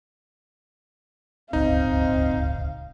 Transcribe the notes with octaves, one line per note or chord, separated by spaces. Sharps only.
D1 G1 C#2 C4 D#4 F5